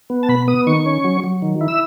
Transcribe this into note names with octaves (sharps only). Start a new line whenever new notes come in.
B3
A5
B2 B5
B3 D#6
D#3 C#6
C#4
F#3
F#3
D#3
E4
E6